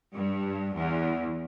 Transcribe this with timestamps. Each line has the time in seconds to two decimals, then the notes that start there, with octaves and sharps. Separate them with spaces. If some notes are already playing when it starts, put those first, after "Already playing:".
0.15 G2
0.76 E2